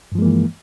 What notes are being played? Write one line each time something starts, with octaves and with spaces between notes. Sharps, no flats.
G2 E3 F3 G#3 A#3